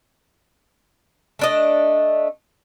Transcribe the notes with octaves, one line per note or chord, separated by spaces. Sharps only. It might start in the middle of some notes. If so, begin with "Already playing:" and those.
A3 D4 D#5